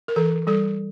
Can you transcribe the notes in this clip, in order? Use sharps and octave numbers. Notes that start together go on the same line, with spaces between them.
A#4
E3 A4
G3 A4